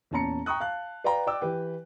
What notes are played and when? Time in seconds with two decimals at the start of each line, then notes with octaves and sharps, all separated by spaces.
0.11 E2 A#2 C#4 A5 A#5 C#7
0.46 G5 A#5 C#6 D#6 F#6
0.60 F5 A5 F#6
1.04 B4 D5 F5 G5 A#5
1.27 D5 G5 D6 E6
1.41 E3 G4 B4 G5